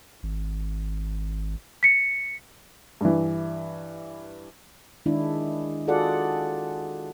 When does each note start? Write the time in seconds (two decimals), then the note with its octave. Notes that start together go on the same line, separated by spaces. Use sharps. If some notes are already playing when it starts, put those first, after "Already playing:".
0.23 G#1
1.83 B6 C#7
3.01 G2 E3
5.06 D#3 G#3 D4 E4
5.88 F4 F#4 G#4 A4 D5 F#5